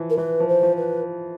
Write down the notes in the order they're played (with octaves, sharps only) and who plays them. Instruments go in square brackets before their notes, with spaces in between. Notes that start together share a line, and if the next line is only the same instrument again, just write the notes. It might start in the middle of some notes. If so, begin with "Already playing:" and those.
Already playing: [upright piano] E3 F3
[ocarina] A#4
[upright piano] E3 [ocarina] B4
[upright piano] F3
[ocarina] C5
[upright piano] F3
[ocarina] B4